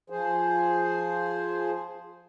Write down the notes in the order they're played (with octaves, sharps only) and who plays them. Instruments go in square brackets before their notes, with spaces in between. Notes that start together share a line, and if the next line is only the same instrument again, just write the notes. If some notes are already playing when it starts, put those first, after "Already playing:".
[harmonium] F3 G#4 C5